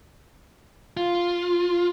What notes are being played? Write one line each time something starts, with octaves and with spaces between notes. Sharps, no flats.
F4